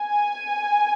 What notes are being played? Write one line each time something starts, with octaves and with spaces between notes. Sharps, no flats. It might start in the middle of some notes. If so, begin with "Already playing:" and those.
Already playing: G#5